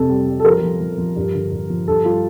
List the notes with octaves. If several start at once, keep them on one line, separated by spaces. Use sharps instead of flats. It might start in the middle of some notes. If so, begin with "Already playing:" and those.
Already playing: F2 C3 A4
G3
G3
A4
F3 A#4
F3
F3
F3
G2
D3
G2
F3
G2 A4
G3 F4